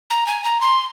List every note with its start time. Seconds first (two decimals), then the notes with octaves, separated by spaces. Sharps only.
0.10 A#5
0.27 G#5
0.44 A#5
0.61 C6